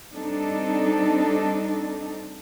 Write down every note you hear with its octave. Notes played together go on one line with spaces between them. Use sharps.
G3 C4 D4 D#4 A4